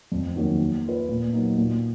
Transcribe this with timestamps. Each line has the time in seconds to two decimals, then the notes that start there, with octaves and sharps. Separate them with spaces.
0.12 F2
0.36 D#3 F#3 A#3
0.60 A#3
0.85 F4 B4
1.09 A#2
1.33 F#3 A#3 D#4
1.58 A#2